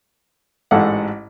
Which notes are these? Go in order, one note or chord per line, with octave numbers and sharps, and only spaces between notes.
A1 G#2 A4 F5 F#5